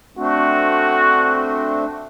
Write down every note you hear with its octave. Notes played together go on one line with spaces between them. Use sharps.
A3 C4 D4 F#4